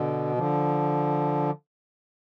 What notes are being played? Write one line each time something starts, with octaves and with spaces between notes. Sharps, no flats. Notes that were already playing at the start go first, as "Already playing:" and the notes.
Already playing: B2 D3
D3 F3